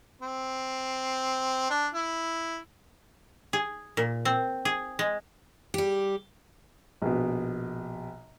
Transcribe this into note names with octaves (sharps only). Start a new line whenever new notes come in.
C4
D4
E4
G#4
A#2
C4
G#4
G#3
G3 G4
A#1 B2